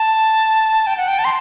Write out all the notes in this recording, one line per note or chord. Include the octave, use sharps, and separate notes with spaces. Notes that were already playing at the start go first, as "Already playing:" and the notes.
Already playing: A5
G5
F#5
G5
A5
C6